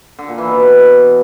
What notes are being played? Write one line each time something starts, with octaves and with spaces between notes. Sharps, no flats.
D3
A#2
E3
B2